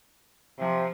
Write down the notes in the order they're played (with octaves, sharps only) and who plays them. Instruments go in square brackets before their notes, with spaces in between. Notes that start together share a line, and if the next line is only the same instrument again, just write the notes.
[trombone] C3 [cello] F3